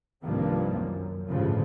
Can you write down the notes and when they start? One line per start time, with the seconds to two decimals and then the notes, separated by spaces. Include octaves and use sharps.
0.24 C2 G2 D#3 F3 A#3 C4
0.76 F#2
1.29 A1 D2 G2 C#3 F3